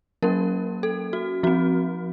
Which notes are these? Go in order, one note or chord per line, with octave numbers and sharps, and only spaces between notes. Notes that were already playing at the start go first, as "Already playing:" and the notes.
F#3 A#3 C#4 A#4
A4
F#4
F3 C4 F#4